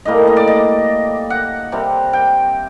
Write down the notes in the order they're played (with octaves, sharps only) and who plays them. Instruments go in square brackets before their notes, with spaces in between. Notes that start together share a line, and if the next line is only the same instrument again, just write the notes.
[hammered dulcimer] A2 G3 A#3 D#5
D#5
D5
D#5
F#5
C3 G3 C4
G5